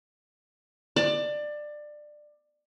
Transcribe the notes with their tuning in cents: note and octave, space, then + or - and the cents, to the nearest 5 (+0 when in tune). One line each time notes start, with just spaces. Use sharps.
D5 +20 A5 +25